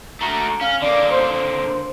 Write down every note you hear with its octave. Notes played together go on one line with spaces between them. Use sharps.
A3 F#4 A#5
C#4 F5
D3 A#3 D5
C5